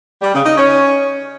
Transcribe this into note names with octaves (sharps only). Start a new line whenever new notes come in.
G3
C#3
D#4
C#4